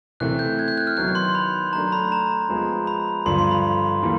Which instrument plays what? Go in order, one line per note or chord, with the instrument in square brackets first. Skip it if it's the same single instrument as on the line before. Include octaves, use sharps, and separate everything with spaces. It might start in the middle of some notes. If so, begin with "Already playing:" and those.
[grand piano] C3 E3 A3 [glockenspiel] F#6
[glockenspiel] G6
F#6 G#6
G6
F#6
F6
[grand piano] D#3 F#3 B3 [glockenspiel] F#6
[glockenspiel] C6
B5
[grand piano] F#3 A3 D4 [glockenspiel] A#5
[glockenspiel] B5
A#5
[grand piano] F3 G#3 B3
[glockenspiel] B5
[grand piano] G2 D3 F3 [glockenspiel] C6
[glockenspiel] C6
B5
[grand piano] E3 G3 A#3